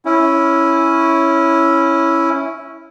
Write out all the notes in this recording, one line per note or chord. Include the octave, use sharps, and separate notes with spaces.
C#4 E4